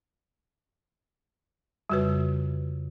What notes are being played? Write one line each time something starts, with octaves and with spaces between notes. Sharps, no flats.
F2 C#3 G3 F#4 B4